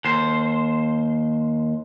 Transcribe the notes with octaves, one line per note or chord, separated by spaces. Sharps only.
D#2 C5